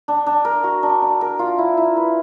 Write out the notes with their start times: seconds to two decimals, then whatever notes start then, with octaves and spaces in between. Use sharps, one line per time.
0.08 D4
0.26 D4
0.45 A#4
0.64 F#4
0.83 D4
1.02 D4
1.21 A#4
1.39 F4
1.58 E4
1.77 E4
1.97 B4